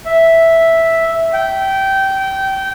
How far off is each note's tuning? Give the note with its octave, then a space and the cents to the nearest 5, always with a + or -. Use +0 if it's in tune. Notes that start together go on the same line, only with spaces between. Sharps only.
E5 -5
G5 -20